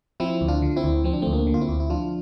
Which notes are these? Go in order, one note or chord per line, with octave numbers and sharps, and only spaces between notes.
F3 C4 E4
D2
D4 F4
D3
C4 E4
D2
F3 C4
D4
D2 A3 C4
A#3 D4
D3
F4
C4 E4
D2
E4
F3 D4 F4